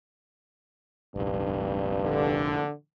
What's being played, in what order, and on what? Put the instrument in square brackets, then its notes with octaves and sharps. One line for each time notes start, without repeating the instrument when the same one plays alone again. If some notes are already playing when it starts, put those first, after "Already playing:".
[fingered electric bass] F1 A#1 [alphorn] G2
[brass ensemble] D3